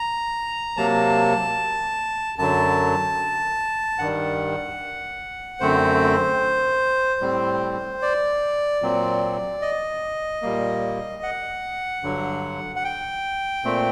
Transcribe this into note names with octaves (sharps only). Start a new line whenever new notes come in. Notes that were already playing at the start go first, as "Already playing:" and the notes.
Already playing: A#5
C3 F#3 A#3 A5
F#2 D3 F#3 A5
G2 D#3 G3 F#5
F#2 D3 A3 C4 C5
A2 G3 C4
D5
A#2 F#3 C4
D#5
A#2 G3 A#3
F#5
G2 D3 F#3
F#5
G5
A#2 A3 C4